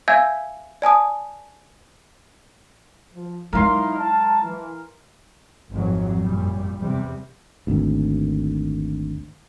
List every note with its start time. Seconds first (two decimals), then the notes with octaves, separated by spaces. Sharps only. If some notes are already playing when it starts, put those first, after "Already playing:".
0.08 E5 F5 G#5 E6 G6 G#6
0.82 D5 G#5 A5 D#6
3.13 F3
3.53 F#3 G#3 D#4 E4 A#4 F5 C6
3.98 A5
4.43 E3
5.72 G#1 F2 F#3
6.20 F#2 A#2 G3
6.79 E2 C3 G3
7.67 G#1 D2